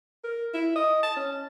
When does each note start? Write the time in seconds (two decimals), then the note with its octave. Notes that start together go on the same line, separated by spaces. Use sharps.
0.24 A#4
0.54 E4
0.75 D#5
1.03 A5
1.16 C#4